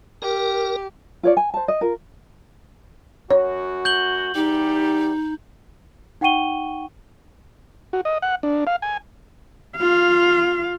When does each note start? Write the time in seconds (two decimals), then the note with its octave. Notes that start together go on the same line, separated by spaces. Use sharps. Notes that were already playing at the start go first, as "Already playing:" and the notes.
0.22 G4 A#4
1.23 F4 C#5 D5
1.37 G#5
1.54 C5 A5
1.68 D#5
1.81 F4 A#4
3.31 F#2 F#4 C#5
3.85 G6 F#7 G7
4.35 E2 G3 D#4 G4
6.21 D#4 F#5 G5 C#6 D#7 G7
7.93 F#4
8.05 D#5
8.22 F#5
8.43 D4
8.67 F5
8.82 G#5
9.77 F4 F5